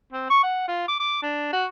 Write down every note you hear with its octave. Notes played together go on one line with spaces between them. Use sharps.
C4
C#6
F#5
F4
D6
D6
D4
F#4